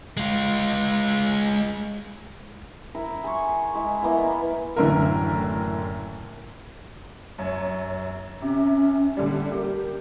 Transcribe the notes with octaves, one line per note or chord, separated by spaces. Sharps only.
G#3 F4
E4 A#4 E5
G#4 G#5 C6 C#6
G#3 E4
E3 A#3 B3 E4
F#1 A2 D3 E3 A#4
F#2 C#5
C3 C#4
A#2 D3 G3
G4 A#4